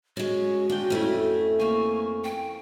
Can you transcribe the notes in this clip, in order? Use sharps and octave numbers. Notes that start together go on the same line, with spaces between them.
G#3 C#4 F#4
D4 F4 G5
F2 A3 C#4 E4
A#3 G#5 C#6
G5